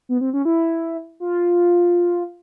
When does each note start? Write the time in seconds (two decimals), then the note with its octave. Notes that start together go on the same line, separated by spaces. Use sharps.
0.09 B3
0.21 C4
0.33 C#4
0.45 E4
1.20 F4